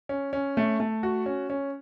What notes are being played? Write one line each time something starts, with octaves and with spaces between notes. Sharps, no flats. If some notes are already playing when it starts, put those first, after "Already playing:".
C#4
C#4
A3
A3
F#4
C#4
C#4